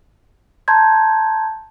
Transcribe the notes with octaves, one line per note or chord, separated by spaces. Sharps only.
A5 A#5 C6 G6 G#6